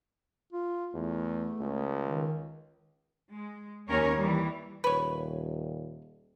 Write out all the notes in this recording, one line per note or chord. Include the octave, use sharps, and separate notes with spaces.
F4
E2 A3
C#2
D#3
G#3
D#2 C#4 A#4 C#5
E3 G3
D#1 B4 C#5